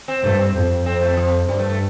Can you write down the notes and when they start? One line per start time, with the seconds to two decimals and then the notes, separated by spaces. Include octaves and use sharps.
0.08 C4
0.24 G2 A3
0.39 C4
0.54 F2
0.86 C4
1.01 A3
1.17 F3
1.48 G2 G3
1.59 A3
1.69 A3